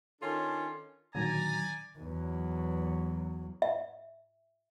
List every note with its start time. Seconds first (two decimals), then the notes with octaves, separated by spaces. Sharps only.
0.20 D#3 C#4 D4 F4 A4 C#5
1.15 A#2 D3 D#3 F#3 D5 G#5 A#5
1.99 E2 F#3
3.62 E5